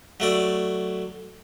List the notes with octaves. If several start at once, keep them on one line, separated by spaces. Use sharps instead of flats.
F#3 A3 D5